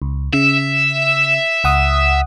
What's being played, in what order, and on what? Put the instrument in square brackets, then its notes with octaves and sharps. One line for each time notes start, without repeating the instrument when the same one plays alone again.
[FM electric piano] C#2
[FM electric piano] C#3 [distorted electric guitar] E5
[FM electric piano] C#2 F#5 D#6